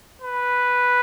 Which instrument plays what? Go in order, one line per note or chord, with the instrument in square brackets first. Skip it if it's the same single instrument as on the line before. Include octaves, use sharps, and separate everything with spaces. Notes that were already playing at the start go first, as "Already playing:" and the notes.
[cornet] B4